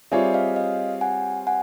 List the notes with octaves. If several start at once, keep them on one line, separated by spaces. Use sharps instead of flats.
G3 C4 F4 G#4 C#5 D5 E5
D#5 F5
D#5 F5
F#5 G#5
F#5 G#5